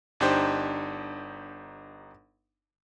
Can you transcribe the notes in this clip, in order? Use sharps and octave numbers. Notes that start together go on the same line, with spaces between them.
G1 D4 D#4 G4 C5